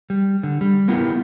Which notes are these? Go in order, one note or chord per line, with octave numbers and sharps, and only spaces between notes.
G3
D3
G3
A#3 B3 E4 F4 G4